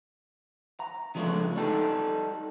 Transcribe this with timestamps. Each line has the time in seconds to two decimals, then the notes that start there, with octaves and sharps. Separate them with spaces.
0.80 A#5
1.15 C#3 F3 G#3 A3 D4
1.56 G3 D#4 A4